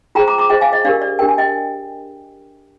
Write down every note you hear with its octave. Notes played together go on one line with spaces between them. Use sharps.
F4 G#4 C5 G5 A#5
A#5 D6
A#5 D6
F4 G#4 C5 D#5 G5
F5 G#5
D#5
D4 G4 A#4 D5 F5
D5
D4 G4 A#4 G5
G#5
D#5 G5